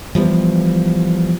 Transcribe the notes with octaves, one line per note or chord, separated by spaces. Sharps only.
E3 F3 G3 B3